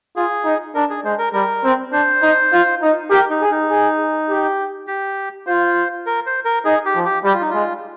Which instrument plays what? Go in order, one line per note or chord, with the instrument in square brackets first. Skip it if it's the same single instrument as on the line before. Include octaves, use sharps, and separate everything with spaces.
[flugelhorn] F4 [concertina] G#4
[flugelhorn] D#4
[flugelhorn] D4 [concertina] A#4
[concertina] G#4
[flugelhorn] G#3 [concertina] C5
[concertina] A#4
[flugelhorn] G3 [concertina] A#4
[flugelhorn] C4
[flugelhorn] D4 [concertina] C5
[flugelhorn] D#4
F4
D#4
[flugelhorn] G4 [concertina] A#4
[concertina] D#4
[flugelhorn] G#4
[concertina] D#4
[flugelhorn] G#4
G4
[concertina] G4
[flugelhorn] F4 [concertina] C5
[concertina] A#4
C5
A#4
[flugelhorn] D#4 [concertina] G#4
[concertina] G4
[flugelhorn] F3
[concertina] G4
[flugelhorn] G3 [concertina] G4
[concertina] F4
D#4
[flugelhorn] G#3 [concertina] F4